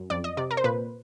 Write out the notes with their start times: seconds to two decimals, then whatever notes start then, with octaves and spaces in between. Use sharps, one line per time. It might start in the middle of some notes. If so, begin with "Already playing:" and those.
Already playing: F#2
0.10 F2 D5
0.24 D#5
0.37 C3 D5
0.51 A#4
0.57 C5
0.64 A#2 B4